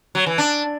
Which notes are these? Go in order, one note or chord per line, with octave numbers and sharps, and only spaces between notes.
F#3
E3
D4